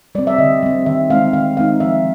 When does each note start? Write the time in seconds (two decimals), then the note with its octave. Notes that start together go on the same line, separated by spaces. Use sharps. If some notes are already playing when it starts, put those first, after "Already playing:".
0.15 G3 C4 D5
0.27 E5
0.38 D3 D#5
0.63 G3 C4
0.86 D#3 E5
1.10 G#3 C4 D#4 F5
1.33 D#3 F5
1.57 G#3 C4 D#4 F5
1.80 F3 E5